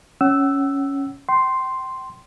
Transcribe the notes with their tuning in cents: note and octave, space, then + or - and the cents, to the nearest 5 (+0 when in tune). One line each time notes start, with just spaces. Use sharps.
C#4 +0 F#5 +35 E6 +0
G5 -35 C6 +0